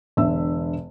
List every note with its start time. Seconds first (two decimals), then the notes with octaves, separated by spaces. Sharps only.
0.17 E1 D3 E5 E6